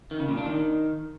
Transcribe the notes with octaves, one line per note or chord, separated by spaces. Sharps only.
D#3
C#3
A#2
D4
D#3